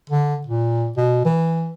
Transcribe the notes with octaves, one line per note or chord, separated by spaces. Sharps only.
D3
A#2
B2
E3